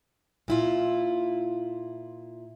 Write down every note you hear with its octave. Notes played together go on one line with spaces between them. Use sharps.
A#2 E4 F4